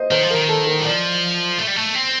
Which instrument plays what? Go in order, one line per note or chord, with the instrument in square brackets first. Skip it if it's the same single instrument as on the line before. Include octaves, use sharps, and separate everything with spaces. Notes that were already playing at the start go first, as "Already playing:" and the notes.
Already playing: [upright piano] C5 D#5
[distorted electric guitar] D#3 [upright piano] C5
[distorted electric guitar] F3
[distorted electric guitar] D#3 [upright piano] A#4
[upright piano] A4
A#4
[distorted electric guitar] G3
[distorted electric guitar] F3 [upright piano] D5
[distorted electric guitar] A3
G3
A3
C4